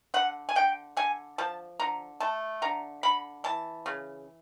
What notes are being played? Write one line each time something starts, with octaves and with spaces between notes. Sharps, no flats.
D3 F#5
G#5
D3 G5
D3 G#5
F3 A5
D3 A#5
A3 A5
D3 A#5
D3 B5
E3 A5
C#3